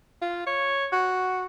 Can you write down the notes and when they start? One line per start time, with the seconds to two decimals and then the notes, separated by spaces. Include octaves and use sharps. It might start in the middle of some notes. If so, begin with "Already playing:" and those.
0.22 F4
0.46 C#5
0.92 F#4